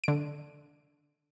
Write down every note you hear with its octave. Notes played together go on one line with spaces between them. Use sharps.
D3 D7